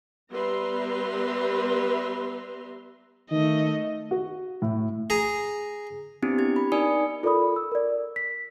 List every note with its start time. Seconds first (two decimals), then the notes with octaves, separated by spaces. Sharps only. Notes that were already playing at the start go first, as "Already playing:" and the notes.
0.31 G3 B3 B4 E5 A#5 C6
3.31 D#3 A3 D#5
4.11 F#4
4.62 A2
5.10 G#4 A#5
6.22 B3 C4 D4 E4 G4
6.38 G4 G#6
6.56 B5
6.72 D#4 A#4 D5 G#5 D#6 C#7
7.23 F4 A4 A#4 D5 B5 D#6
7.56 E6
7.72 A#4 D5
8.16 B6